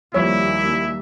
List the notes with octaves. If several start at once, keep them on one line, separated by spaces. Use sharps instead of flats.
D#2 F3 G3 A#3 E4 C#5 E5